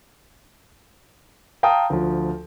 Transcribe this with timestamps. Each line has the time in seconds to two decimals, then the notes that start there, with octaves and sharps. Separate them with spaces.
1.63 F5 G5 A5 A#5 D#6
1.90 D2 F3